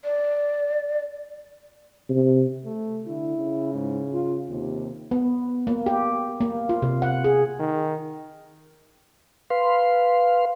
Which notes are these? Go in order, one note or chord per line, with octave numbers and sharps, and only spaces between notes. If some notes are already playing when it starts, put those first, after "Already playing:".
D5
C3
A3
D3 E4
C#3
G#2
F4
D#2 C3
B3
A#3
G4
A#3
F4
C3
F#5
G#4
D#3
B4 F5 C6